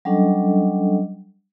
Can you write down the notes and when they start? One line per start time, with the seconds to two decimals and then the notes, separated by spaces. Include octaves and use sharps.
0.05 F#3 G3 C#4 D4 A4 D#5